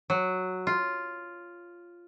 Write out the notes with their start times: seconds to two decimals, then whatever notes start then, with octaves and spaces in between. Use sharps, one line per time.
0.10 F#3
0.67 F4